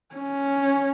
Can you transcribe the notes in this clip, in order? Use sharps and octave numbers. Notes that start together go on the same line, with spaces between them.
C#4